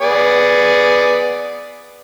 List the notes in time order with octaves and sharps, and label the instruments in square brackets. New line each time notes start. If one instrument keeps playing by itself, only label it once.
[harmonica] B3 G#4 D5